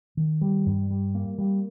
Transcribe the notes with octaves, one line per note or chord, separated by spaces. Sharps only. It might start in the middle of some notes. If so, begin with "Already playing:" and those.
D#3
G3
G2
G3
A#3
G3